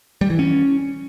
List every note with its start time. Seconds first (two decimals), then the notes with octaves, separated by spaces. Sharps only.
0.21 G3
0.30 E3
0.39 C#4